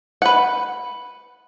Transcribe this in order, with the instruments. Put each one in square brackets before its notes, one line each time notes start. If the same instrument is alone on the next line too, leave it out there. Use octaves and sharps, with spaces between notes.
[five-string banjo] B4 F#5